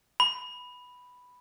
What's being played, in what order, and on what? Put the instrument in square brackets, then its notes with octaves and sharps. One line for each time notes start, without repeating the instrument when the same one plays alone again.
[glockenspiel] B5